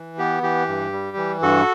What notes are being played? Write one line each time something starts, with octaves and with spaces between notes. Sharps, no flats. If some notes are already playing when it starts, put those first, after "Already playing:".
Already playing: E3
B3 G4
E3 G4
G2
G3
E3
G2 F#4 A4